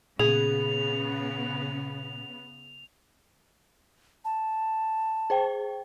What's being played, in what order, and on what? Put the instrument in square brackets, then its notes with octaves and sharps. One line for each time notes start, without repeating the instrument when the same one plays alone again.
[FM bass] A#2 [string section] C#3 B3 [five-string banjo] G#4 [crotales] F7
[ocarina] A5
[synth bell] G#4 C5 G5